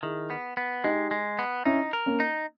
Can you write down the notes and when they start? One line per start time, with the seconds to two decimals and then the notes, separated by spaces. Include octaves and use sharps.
0.03 D#3 E4 G#4
0.30 B3
0.57 B3
0.84 G#3 D#4 G4
1.11 G#3
1.39 B3
1.65 C#4 D#4 E4
1.93 A#4
2.06 A#3 C#4
2.20 D#4